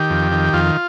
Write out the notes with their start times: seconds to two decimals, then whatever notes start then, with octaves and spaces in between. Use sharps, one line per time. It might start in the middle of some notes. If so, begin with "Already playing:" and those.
Already playing: D#3 G4
0.10 F2
0.32 D#3
0.53 F2 F4